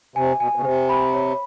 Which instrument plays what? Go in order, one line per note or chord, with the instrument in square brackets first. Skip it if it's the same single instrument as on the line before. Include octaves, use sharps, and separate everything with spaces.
[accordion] C3 [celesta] G#5
[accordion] B2 [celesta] G#5
[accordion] B2
C#3
[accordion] C3 [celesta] C5
[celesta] B5
C#5